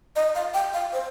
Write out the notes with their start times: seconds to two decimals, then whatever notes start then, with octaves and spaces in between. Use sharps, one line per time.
0.16 D#5
0.35 F5
0.54 G5
0.73 F5
0.93 C5